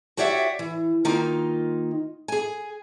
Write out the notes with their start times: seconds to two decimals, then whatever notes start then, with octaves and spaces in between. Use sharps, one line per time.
0.17 F#4 G4 C#5 D5 E5 F#5
0.59 E3
1.05 D#3 A#3 D#4 F4
2.28 G#4 G#5